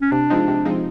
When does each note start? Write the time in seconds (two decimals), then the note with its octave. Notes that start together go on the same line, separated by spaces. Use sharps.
0.01 C#4
0.12 C3 D4
0.30 F3 G#3 C4 D#4
0.48 C3
0.65 F3 G#3 C4 D#4